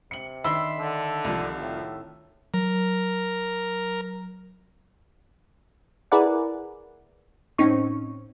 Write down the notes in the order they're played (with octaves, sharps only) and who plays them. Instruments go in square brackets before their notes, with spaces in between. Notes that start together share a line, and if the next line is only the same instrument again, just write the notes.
[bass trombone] C3 [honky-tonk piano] C#7 F#7
[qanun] D#3 D4 C6 [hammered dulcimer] E5 [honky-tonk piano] B5
[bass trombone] D3
[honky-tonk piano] C2 F3
[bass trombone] A2
[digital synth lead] F#3 [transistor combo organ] A#4
[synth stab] E4 G#4 A#4 B4 D5 F#5
A2 C4 C#4 D#4 C#6